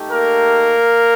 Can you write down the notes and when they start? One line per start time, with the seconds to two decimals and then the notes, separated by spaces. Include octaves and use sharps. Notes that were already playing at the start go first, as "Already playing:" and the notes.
Already playing: A3 D#4 G4
0.10 A#3 A#4